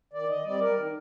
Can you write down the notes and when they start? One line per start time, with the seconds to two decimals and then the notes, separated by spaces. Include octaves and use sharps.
0.13 D#3 D5
0.30 D#5
0.45 G3 C4 D5
0.61 A#4
0.77 D#3